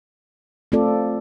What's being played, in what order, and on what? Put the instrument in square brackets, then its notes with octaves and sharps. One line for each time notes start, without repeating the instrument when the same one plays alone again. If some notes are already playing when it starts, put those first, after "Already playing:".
[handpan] A3 C4 F4 A4 D5